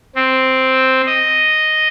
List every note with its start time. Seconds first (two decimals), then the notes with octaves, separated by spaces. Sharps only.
0.15 C4
1.07 D#5